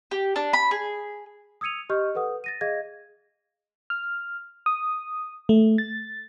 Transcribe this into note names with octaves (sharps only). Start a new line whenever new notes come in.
G4
D4
B5
G#4
D#6 E6 G#6 C#7 D#7 F7
G4 D#5 C#6 F6 G6
A4 B4 F#5 D#6
A6 A#6 D#7
G#4 D#5 F5 G#6 A#6
F6
D#6
A3
A6